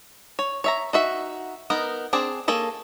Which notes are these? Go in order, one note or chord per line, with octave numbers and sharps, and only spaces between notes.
C#5
C#5 E5 A#5
D#4 F#4 E5
B3 D#4 A#4
C4 D4 G#4 D5
A#3 G#4 A4 C#5